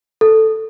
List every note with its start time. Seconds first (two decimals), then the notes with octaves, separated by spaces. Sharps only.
0.21 A4